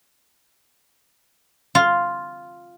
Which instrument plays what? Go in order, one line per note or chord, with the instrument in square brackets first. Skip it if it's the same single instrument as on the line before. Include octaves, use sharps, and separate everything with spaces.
[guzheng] F4